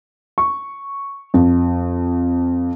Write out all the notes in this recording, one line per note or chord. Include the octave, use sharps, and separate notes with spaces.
C#6
F2